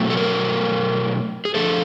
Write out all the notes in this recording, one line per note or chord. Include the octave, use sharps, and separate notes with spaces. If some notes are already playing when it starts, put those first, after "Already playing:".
Already playing: B2 F#3 A3
A4
A#4
G#4
D3 F3 A3 A4